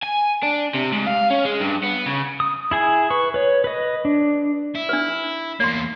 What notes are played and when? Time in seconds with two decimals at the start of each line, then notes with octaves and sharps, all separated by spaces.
0.03 G#5
0.43 D4
0.74 C3
0.92 G#2
1.06 F5
1.30 C#4
1.45 G#3
1.60 G2
1.83 B3
2.06 C#3
2.40 D#6
2.71 E4 G#4 G#5
3.10 B4 C#6
3.34 B4 C#5
3.64 B4 D#5
4.05 D4
4.75 E4
4.89 D4 B4
5.60 E2 A#3 D5 C6